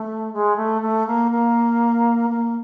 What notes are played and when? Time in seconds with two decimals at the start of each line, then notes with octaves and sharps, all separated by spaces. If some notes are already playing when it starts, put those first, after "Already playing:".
Already playing: A3
0.32 G#3
0.56 A3
0.81 A3
1.06 A#3
1.31 A#3
2.29 A#3